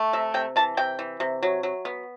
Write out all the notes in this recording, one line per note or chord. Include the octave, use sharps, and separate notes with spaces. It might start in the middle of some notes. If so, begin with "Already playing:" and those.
Already playing: A3
C3 E5
C3 G5
E3 A5
C3 G5
E3
C3
F#3
F#3
B3